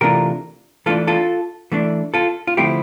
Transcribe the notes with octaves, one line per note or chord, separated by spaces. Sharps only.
C3 E3 A3 D4 F4 G4 A#4
E3 A3 D4 F4 A4
F4 A4
E3 A3 D4
F4 A4
F4
D3 F3 A3 C4 E4 G4